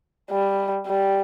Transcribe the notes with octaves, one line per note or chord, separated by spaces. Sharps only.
G3
G3